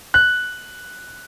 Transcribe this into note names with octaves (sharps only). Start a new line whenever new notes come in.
F#6